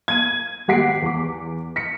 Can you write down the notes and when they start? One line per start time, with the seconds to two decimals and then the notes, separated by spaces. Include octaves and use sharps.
0.08 G#6 D#7
0.68 G#1 G4 F#5 B6 C7 D7
1.02 E2 D6
1.76 B6 C#7